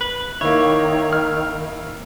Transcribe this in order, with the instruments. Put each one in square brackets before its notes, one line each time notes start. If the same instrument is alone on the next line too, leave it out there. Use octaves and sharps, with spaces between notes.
[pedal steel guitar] B4
[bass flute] D#3 [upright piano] A#3 E4 [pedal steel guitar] C#5
[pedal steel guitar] F6